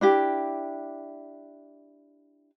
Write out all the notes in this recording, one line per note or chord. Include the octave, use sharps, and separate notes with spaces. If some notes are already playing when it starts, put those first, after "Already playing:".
D4 E4 G4